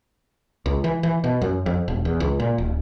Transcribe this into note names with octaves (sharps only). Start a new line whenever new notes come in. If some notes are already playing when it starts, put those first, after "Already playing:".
C#2
E3
E3
B2
F#2
F2
E1
E2
C#2
A#2
D1